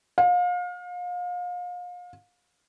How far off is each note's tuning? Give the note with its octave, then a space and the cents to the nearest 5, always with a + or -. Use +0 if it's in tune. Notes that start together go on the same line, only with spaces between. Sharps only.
F5 +35